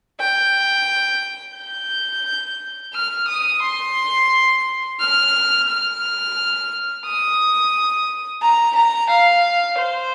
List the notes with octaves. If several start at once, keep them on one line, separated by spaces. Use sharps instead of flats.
G5
G6
F6
D#6
C6
F6
F6
D#6
A#5
A#5
F5
C5